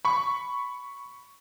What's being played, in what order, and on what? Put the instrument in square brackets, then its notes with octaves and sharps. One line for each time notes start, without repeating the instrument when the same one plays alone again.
[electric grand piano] B5 C#6